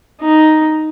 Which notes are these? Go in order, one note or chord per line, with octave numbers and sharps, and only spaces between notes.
D#4